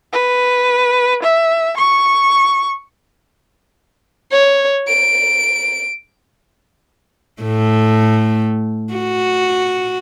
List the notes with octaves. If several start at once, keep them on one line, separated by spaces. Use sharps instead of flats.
B4
E5
C#6
C#5
D7
A2 A3
F#4